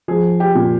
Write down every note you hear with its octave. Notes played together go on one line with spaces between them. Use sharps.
F3 G#4
G4
A#2